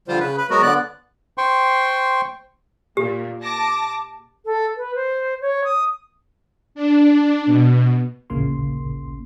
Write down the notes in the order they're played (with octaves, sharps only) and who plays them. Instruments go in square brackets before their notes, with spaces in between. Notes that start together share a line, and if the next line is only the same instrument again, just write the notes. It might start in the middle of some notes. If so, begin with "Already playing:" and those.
[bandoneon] D3 F3 G3 F4 C5
C#3 B4
B4 B5
F#3 G#3 B3 F#4 A#4
D3 B3 D5 F#6
[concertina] C5 G5 C6 C#6
[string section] A#2 [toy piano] G4
[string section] A5 D6 A#6
[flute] A4
B4
C5
C#5
D#6
[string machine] D4
B2
[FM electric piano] A1 D2 A#2 C#3 A#3 C6